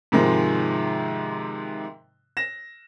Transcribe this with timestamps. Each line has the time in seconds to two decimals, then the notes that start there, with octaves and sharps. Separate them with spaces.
0.12 G#2 C3 D#3 F3 G#3
2.37 A#6 E7